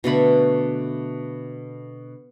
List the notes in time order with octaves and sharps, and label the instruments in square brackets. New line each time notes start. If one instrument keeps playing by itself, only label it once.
[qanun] B2 D3 A3 B5